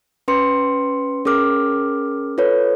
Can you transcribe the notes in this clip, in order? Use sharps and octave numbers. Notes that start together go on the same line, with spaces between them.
C#4 B4 C6 C#7
C#4 G#4 A#4 D6 F6
F4 A4 B4 C#5